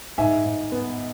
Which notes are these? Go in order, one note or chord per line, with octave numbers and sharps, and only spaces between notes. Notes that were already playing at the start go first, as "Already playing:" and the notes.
G#2 E5 G#5
G#2
B3